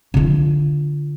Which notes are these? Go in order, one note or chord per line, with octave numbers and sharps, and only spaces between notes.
D3 F4